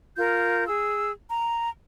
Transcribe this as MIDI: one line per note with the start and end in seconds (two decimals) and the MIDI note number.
0.17 0.66 65
0.17 0.66 70
0.17 0.66 91
0.67 1.12 68
0.67 1.12 88
1.30 1.70 82